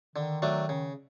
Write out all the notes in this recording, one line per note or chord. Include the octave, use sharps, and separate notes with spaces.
D3 D#3
F#3 A3 D4
C#3